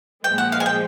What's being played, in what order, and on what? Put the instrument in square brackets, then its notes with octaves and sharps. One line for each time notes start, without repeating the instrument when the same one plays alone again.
[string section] A#2 F3 G#3 [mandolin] G5
[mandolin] F#5
F5
G#5
G5